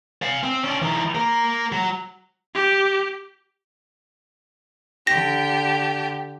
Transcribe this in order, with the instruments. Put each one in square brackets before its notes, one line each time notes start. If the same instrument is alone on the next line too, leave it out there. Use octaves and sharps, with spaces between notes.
[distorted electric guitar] F5 G#5
C4
C#4 D5
E3 D#4
A#3 A#4
F#3
[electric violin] G4
[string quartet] D3 G4 [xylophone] A#6